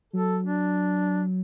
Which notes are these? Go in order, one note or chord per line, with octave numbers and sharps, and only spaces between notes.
F#3 A4
D4